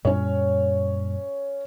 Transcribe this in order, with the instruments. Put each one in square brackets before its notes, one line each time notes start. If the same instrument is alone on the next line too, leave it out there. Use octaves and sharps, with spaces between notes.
[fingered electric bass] F#2 A#2 G3 [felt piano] C#4 C#5